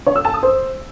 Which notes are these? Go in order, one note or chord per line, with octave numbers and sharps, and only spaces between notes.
C#5
E6
A5
D#6
C5